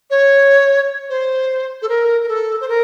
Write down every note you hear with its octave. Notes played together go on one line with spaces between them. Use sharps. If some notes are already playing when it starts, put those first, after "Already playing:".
C#5
C5
A4
A#4
A#4
A4
C5
A#4